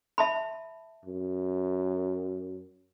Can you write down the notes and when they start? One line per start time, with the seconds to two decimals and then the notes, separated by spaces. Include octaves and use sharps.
0.18 E5 A5 B5
1.05 F#2